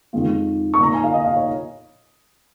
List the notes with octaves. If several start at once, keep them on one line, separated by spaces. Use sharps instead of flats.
F2 D#3 G#3 F4
C#6
A#2 A#3 D#4 A#5
G#5
F5
D#5
F5
C#5